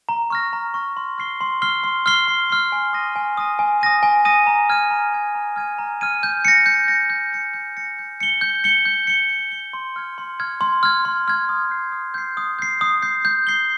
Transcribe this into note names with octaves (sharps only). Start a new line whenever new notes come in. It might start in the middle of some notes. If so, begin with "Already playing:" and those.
A#5
C#6 F6 A#6
A#5
C#6 F6 A#6
C6
F6 C7 G7
C6
F6 C7 G7
C6
F6 C7 G7
C6
F6 C7 G7
G#5
D#6 A#6 D#7
G#5
D#6 A#6 D#7
G#5
D#6 A#6 D#7
G#5
D#6 A#6 D#7
A#5
F6 G#6 D#7
A#5
F6 G#6 D#7
A#5
F6 G#6 D#7
A#5
F6 G#6 D#7
G6
A#6 C#7
G6
A#6 C#7
G6
A#6 C#7
G6
A#6 C#7
G6
C#7 G7
G6
C#7 G7
G6
C#7 G7
G6
C#7 G7
C6
F6 G#6
C6
F6 G#6
C6
F6 G#6
C6
F6 G#6
D#6
G6 C7
D#6
G6 C7
D#6
G6 C7
D#6
G6 C7
G6
C7 G7